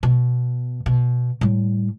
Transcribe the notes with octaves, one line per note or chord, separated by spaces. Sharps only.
B2
B2
A2 G3